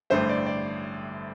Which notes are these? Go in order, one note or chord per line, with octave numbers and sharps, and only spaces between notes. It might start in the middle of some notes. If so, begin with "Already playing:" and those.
A1 G2 D3 A3 C5
D5
D5